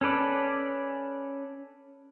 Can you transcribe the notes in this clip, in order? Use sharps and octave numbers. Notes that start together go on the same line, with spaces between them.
C#4 A4 B4 D5